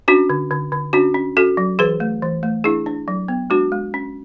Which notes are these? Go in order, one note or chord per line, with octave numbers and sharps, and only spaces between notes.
C#4 D4 F#4
D3
D3
D3
C#4 D4 F#4
C#4
C#4 F#4 A4
F#3
E3 G#4 B4
A3
E3
A3
D4 E4 G#4
D4
F#3
B3
G#3 D4 F#4
G#3
C#4